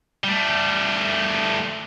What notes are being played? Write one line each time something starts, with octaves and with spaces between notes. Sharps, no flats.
G3 A3